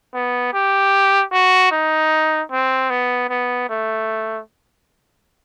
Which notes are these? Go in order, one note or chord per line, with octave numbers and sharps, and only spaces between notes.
B3
G4
F#4
D#4
C4
B3
B3
A3